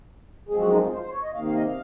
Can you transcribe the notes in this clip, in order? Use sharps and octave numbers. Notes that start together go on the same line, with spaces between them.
F#2 F3 G#3 C4 G#4
F#4
D#4
F4
C5
C5
C#5
D#5
C3 D#3 A#3 F5
F5
D#5
F5